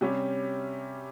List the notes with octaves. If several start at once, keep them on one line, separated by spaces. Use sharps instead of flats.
C3 G3 C#4 G4